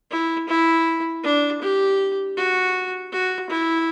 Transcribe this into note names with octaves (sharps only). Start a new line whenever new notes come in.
E4
E4
D4
G4
F#4
F#4
E4